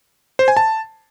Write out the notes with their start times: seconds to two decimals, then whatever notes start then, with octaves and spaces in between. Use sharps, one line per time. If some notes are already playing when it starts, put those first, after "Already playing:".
0.39 C5
0.48 G#5
0.57 A5